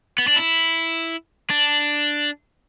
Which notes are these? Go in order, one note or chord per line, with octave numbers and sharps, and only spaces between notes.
B3
D4
E4
D4